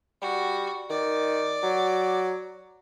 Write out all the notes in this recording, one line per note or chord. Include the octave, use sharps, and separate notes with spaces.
G3 F#4
D#3 D5
F#3